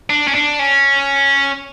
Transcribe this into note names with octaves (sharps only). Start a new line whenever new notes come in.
D4
C#4
D4
C#4